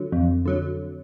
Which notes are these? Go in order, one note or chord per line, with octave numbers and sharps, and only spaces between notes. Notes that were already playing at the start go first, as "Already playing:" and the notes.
Already playing: D3 F#3
F2
D3 F#3